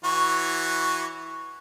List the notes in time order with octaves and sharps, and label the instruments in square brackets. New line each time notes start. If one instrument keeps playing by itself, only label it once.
[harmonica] E3 F#4 C#5